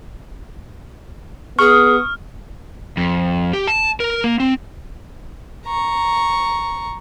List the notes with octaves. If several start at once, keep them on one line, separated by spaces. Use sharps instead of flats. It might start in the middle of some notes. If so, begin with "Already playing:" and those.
B3 G#4 C#6 D#6 F6
F2
G4
A5
A#4
A#3
C4
A#5 C#6